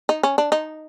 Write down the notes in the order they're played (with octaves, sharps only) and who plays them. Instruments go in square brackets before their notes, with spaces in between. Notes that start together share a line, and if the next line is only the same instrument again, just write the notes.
[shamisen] D#4
C#4
D4
D#4